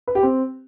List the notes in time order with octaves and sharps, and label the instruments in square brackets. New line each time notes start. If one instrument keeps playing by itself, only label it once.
[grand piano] B4
G4
C4